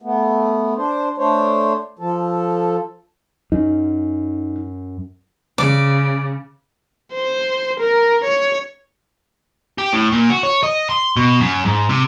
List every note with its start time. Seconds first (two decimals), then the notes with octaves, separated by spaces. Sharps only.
0.02 A3 B3
0.76 D4 C5
1.18 A3 D4 C5 C#5
1.99 F3 A4
3.52 F#2 D#4
5.58 C#3 D5
7.14 C5
7.80 A#4
8.24 C#5
9.78 G4
9.93 A2
10.12 A#2
10.30 F#4
10.43 C#5
10.63 D#5
10.90 C6
11.16 B2
11.41 F#2
11.65 G#2
11.89 C3